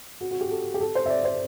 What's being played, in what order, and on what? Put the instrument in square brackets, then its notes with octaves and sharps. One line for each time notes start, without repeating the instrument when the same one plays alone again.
[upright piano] F#4
F#4
G4
A4
G4
A4
C5
E5
D5
C5